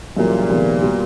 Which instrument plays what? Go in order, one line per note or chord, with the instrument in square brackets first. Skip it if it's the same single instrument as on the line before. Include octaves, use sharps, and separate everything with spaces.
[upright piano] F#2 C#3 E3 G3 A#3 [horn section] A#2
[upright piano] F2 C3 D#3 G#3 B3
B2 G3 B3